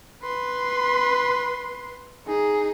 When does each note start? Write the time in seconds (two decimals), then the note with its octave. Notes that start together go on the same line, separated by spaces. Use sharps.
0.23 B4 C6
2.27 D#4 G#4